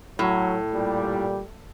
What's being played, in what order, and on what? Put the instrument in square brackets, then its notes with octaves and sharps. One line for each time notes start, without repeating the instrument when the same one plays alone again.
[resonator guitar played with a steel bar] A2 [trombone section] F#3
[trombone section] A#2 G3